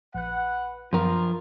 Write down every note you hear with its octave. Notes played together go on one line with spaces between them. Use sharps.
A#1 B4 F#5 F#6
F#2 F3 F#3 B3 F4 A#4